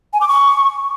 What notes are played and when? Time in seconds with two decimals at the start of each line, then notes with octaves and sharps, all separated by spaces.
0.13 G#5
0.21 D6
0.28 C#6